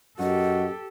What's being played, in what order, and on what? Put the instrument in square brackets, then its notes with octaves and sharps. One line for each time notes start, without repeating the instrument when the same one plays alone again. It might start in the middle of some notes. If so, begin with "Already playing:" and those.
[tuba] F#2 [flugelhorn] F#4 [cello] G4 A4 [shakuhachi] D#5